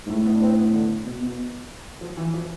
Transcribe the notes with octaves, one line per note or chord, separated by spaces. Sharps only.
G#2
A2 A3
B3
D4
C4
B3
D3
B2
B2
F3
E3
F3